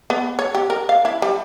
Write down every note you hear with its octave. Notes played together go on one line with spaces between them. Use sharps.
B3
C#5
G4
A#4
F5
E4
G3